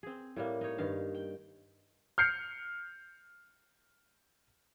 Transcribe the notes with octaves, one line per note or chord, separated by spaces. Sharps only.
C4 G#4
A2 G3 A#3
D#4 C#5
G2 D#3 F5
G5
F6 G6 C7 C#7